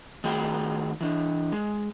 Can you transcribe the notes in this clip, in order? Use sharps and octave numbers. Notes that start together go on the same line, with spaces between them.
D#3 A3 F#4 G#4 G5
E3 D4
G#3